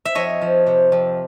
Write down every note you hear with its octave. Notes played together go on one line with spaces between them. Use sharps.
E5
F2 C#5 D#5
F3
C3
F2